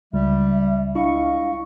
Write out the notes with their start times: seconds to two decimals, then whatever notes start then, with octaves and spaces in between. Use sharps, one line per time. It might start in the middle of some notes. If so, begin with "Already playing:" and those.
0.13 C#2 G3 E5
0.95 C#2 D4 E4 D#5 F5 C#6